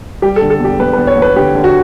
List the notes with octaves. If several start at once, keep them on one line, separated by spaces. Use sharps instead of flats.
G3 G4
A4
D3
A4
E2 G4
E2 B4
B4
E2
C#5
E2
B4
D3 G4
D3
F#4